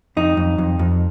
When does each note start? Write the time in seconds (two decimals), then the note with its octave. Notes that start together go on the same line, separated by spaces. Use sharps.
0.17 F2 D#4
0.37 F2
0.58 F2
0.79 F2